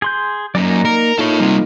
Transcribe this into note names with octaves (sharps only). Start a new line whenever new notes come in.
G#4 C6 G6
F#2 A#3 D#4 D5
A#4
A#3 D#4 F4 A4 C#5
G3 C4